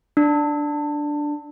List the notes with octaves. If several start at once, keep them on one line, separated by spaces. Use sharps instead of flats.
D4